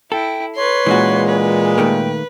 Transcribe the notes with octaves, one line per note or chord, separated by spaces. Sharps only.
E4 A4 G5
B4 C#5 C6
A#2 E3 G#3 C#4 F#4
B4
D#3 A3 A#3 G5